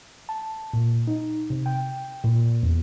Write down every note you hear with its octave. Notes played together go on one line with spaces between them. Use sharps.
A5
A#2
D#4
C3
G5
A#2
E2